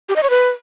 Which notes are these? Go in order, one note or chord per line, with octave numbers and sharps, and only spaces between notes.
G4
D#5
C#5
B4